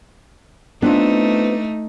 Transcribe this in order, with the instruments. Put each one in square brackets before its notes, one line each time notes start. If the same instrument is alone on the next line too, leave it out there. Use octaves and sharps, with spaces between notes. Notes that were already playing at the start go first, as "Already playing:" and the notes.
[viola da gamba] A3 D#4 [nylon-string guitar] B3 C4 F4 [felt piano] D4